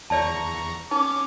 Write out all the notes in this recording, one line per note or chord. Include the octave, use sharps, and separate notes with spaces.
E2 C#5 D5 A5 A#5 C#6
C#4 D#4 D6